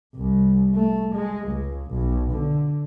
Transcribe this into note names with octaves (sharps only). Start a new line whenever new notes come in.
C2
A3
G#3
C#2
B1
D3